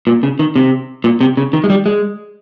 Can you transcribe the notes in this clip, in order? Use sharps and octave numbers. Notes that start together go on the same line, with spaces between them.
A#2
C#3
D#3
C3
A#2
C3
C#3
D#3
G#3
G3
G#3